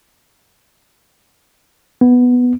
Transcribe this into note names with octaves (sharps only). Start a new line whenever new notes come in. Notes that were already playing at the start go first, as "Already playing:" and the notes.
B3